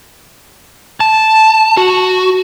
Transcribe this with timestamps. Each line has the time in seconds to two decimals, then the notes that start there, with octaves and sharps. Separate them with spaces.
1.00 A5
1.77 F#4